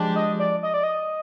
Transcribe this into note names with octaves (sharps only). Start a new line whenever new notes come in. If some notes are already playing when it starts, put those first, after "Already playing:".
Already playing: F3 G#3 D4 G4
D#5
D5
D#5
D5
D#5